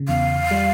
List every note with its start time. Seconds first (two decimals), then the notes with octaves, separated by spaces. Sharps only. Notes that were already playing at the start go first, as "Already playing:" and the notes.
Already playing: C#3
0.08 E2 F5
0.51 G3